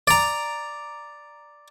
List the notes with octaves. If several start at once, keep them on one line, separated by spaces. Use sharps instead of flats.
D5 A#5